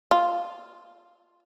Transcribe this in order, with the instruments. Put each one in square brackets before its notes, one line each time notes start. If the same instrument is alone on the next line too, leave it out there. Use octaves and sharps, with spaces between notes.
[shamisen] F4